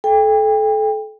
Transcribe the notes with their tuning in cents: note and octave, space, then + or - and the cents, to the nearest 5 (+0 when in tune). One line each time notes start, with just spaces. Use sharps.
A4 -30 G5 +30